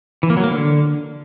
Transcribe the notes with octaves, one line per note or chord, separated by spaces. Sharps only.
E3
A#3
F#3
A#3
D3